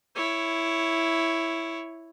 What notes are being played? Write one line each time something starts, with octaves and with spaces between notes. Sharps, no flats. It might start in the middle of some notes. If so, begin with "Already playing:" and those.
E4 C#5